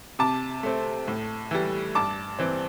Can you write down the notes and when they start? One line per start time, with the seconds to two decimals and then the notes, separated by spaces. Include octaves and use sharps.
0.19 C3 A5 D6
0.63 A3 C4
1.08 A2
1.51 E3 G3
1.95 G2 A5 D6
2.39 E3 C4